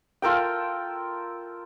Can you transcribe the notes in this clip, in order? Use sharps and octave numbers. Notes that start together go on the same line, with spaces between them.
F4 A4 A#4 G5